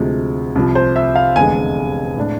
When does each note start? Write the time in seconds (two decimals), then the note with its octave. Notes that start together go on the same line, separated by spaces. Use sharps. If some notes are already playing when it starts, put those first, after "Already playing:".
Already playing: D2 C3 F3 G#3
0.55 C2 C3 F3
0.75 C5
0.96 E5
1.16 F5
1.36 F1 E2 D3 G#3 G#5
2.17 A2 G#3 D4